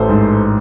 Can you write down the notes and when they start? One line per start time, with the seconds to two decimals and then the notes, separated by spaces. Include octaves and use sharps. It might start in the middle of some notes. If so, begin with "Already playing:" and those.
Already playing: A1 A4 C5
0.09 G#2